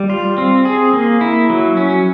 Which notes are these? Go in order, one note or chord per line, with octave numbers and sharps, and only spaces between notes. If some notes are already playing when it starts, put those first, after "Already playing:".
Already playing: G3
F4
C4
G#4
A#3
E4
F#3
C#4